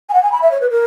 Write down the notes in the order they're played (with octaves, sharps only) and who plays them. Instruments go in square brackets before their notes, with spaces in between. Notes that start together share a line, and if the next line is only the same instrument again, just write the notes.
[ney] G#5
F#5
G#5
B5
E5
C#5
B4
A#4